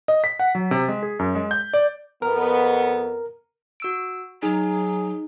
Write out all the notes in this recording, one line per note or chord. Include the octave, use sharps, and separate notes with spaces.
D#5
B6
F#5
F#3
C3
G#3
G#4
F#2
G#3
G6
D5
F2 B3 A#4
F#4 E6 D7
F#3 D#4 G#4